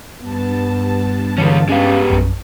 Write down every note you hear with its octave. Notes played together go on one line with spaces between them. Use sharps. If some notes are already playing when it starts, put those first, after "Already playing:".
G2 B3 A5
D2 D3 E3 G#3 B3 C#4 F5
G#3 B3 C#4 G4 F5
A#1 F#2